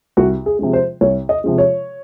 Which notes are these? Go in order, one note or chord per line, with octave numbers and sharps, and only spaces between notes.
C2 F#4
G#4
C3 F3 G#3
C5
C2 C#5
D#5
C3 F3 G#3
C#5